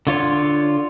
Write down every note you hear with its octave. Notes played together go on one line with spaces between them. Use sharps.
D3 F4 C#5